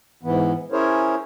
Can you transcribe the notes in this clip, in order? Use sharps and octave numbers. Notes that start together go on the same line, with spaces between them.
G#2 E3 B3
C#4 E4 G#4 A#4 C5 C#5